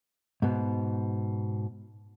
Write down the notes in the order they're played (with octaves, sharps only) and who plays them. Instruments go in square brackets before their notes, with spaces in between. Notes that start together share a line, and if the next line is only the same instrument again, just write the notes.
[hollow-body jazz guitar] G#2 B2